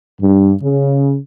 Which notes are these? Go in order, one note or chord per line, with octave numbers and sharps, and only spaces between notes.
G2
C#3